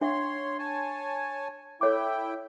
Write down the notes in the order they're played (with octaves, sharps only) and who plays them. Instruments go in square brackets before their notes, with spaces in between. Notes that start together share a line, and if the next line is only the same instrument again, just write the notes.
[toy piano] D4 E5 F#5 [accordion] C#5 C6
[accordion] C#5 G#5 A5
[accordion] E4 G5 [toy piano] A4 C#5 D6